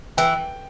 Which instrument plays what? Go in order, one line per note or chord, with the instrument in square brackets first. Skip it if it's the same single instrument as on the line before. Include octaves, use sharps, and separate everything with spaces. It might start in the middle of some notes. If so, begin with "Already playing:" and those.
[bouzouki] E3 [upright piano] G5